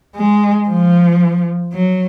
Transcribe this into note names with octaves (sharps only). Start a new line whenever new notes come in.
G#3
F3
F#3